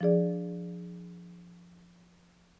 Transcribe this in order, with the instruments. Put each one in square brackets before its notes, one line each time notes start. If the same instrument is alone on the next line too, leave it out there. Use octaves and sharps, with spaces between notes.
[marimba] F3 D4 G#4 D5